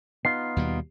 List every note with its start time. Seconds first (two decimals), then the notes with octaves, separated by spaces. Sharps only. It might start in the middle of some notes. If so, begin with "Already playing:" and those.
0.25 B3 D#4 F4 C7
0.56 D#2 B2 G3